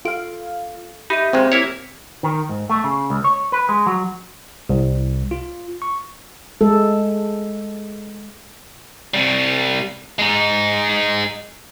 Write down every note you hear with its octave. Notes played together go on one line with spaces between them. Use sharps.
F4 A4 F5 D7
D#4 G4 E5 B5 D#7
A#2 D#3 G#3 C4
A#3 E4 C#5
D#3
G#2
A3
C#3
C#2
C#5
B4
G#3
F#3
C2
F4
C#6
G#3 A4
C3 G3
G#3 D#4